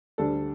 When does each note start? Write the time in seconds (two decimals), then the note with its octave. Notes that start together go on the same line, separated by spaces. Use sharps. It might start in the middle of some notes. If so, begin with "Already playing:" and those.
0.18 D2 D3 G3 D4 A4